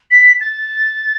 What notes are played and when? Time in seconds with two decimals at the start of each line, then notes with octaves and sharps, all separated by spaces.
0.11 B6
0.41 A6